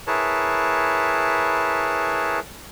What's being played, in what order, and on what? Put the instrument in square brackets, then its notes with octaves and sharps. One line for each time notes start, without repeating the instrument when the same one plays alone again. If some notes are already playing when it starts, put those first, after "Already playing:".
[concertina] E4 G#4 A#4 B4 C#5 A5